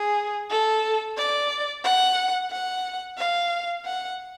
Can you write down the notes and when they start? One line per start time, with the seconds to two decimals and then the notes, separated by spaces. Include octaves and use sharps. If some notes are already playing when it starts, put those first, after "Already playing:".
Already playing: G#4
0.50 A4
1.18 D5
1.84 F#5
2.51 F#5
3.18 F5
3.85 F#5